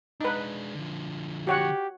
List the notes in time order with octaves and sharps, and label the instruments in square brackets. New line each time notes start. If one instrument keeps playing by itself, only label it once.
[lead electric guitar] G#3 D4 [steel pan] D#4 B4
[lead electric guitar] D3 F3
[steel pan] F#4 C#5 F#5 [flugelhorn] G4